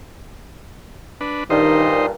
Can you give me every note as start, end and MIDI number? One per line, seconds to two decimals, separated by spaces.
1.21 1.44 62
1.21 1.44 71
1.50 2.11 43
1.50 2.11 46
1.50 1.92 51
1.50 2.06 63
1.50 2.06 72